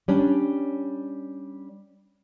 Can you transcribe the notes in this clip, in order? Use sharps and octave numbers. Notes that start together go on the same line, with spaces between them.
G3 C#4 D4